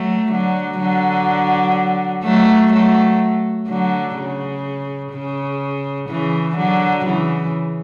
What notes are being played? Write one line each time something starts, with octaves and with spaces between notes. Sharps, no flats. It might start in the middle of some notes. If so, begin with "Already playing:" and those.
Already playing: F#3 A3
D3 F#3
D3 F#3
F#3 A3
F#3 A3
D3 F#3
C#3
C#3
C#3 E3
D3 F#3
C#3 E3